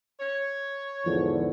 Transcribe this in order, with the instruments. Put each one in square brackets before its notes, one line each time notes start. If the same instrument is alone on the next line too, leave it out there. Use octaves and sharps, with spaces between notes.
[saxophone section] C#5
[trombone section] E2 G#2 D3 [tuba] F3